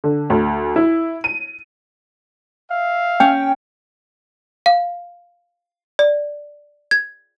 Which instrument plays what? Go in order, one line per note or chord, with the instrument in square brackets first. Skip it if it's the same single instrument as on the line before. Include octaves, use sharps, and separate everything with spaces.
[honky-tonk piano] D3
D2
E4
D#7
[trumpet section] E5 F5
[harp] C#4 [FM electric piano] G5
[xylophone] F5
D5
G#6